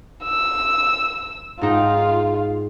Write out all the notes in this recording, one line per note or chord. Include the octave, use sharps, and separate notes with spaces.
E6
G#2 D#4 F4 G5